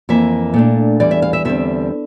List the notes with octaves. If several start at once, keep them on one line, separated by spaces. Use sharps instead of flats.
F2 E3 A#3 E5
A#2 A3 D4
E2 E3 G3 D5
E5
F5
E5
E2 D3 G3 C4 E5